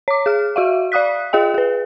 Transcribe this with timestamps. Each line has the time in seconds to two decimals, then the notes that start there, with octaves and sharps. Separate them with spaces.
0.08 C#5 D6
0.26 G#4 F6
0.56 F#4 E5 F5
0.92 D5 F5 D#6 F#6 B6
1.33 F4 G#4 D#5 G5
1.54 G#4 B4